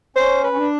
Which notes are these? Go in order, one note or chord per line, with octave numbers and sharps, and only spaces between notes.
C#4 C5
B4
C#4
D4